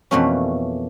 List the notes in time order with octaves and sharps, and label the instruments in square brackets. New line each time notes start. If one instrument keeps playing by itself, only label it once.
[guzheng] F2 B2 E3 A3 A#3 C#4